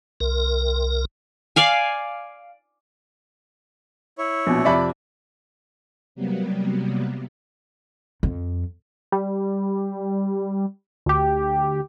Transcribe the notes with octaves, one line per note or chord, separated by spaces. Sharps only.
C2 A#4
D5 F5 G#5
E4 C#5
A#1 B2
F2 C3 D5 E5 B5
C3 F#3 G3 A#3 B3
F2
G3
D2 G4